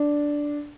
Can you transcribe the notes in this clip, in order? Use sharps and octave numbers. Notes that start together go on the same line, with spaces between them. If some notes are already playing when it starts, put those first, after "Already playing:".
Already playing: D4